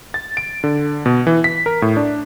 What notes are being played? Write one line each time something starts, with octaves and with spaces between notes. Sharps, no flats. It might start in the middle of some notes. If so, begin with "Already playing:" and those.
A6
D7
D3
B2
E3
B6
A#4
A2
D4